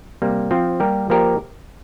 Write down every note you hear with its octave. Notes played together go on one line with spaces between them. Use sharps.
C3 G3 A#3
F3 C4 F4
G3 A#3 G4 A#4
F3 A#3 G4 A#4 D5